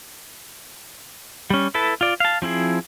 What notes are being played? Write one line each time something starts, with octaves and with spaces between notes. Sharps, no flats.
G3 C#4
E4 A4 B4 A5
F4 D5
F5 A5
F3 C4 E4 G#4